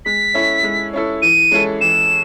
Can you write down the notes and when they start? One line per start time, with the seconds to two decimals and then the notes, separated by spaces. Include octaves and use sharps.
0.05 G#3 B6
0.34 C#4 E4 A4
0.63 G#3
0.93 C#4 E4 A4
1.22 E3 D#7
1.51 G#3 C#4 E4 A4
1.81 E3 E7